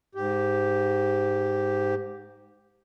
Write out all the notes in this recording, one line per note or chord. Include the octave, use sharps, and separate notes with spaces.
G#2 G4